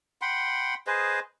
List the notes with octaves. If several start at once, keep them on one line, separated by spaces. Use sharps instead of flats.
F#5 G5 B5 C6
G#4 B4 C5 D#5